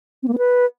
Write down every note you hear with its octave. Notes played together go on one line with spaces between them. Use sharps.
C4
A#3
B3
B4